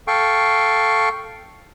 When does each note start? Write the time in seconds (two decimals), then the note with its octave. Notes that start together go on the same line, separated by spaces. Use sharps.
0.07 A4 F5 G5 C#6